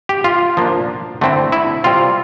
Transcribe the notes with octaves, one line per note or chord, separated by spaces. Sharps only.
G4
F4
F3 A#3 D4
D3 A3 C4 E4
E4
C3 G3 C4 F4